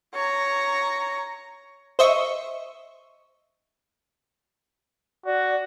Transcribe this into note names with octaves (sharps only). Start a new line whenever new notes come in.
C#5 A#5
C5 D#5 E5 C#6
F#4 D5